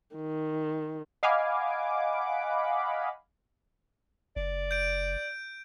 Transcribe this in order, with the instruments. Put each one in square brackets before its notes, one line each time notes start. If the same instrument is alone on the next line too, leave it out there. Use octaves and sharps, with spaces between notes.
[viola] D#3
[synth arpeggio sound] D#5 F5 F#5 G#5 B5 D6
[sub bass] F#1 [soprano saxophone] D5
[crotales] G6 D7